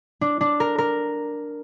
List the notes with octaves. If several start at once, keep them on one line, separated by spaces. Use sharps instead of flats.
D4
D4
A#4
A#4